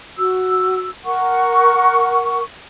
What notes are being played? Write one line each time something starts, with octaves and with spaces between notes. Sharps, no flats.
F#4 E6
A#4 F#5 C#6